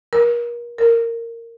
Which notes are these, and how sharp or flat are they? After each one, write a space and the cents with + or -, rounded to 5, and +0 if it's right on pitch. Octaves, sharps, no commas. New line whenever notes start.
A#4 +35
A#4 -15